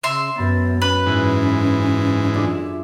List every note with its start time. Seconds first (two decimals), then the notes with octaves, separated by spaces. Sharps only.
0.03 C#3 E5 C6
0.36 F#2 B3 B5 A6
0.82 C#4 B4
1.06 G#2 E3
2.35 D4 F4 G#4
2.52 E5